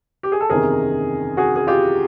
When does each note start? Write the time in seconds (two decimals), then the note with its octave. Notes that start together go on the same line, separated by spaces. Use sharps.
0.23 G4
0.32 G#4
0.41 A4
0.50 F#1 E2 C3 D#3 G#4 A#4
1.37 F#4 G#4
1.56 G#4
1.67 F4 G4